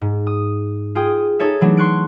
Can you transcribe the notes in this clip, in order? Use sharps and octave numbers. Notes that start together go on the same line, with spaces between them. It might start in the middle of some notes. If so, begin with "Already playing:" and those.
G#2
D#6
F4 G#4 G5 D#6
D#4 G#4 A4 C#5 E5
E3 F#3 A3 D4
C6 C#6 F#6 D7